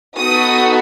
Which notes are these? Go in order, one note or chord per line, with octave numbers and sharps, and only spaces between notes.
B3 D#4 F#4 A4 D#6